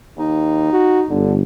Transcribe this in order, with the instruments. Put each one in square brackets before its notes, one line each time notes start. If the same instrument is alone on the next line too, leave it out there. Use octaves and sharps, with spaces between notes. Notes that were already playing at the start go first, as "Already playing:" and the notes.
[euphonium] D#2 [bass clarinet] D#4
[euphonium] F#4
[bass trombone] G1 [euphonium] D3